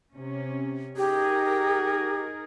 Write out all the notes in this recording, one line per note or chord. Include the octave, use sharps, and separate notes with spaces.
C3 C#4
D#4 G4 G#4 A#4